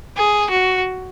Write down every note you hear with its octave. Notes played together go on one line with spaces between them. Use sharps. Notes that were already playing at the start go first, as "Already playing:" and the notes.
G#4
F#4